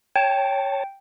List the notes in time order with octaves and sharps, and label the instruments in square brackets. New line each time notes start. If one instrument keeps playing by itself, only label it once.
[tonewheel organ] C#5 A5 [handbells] G5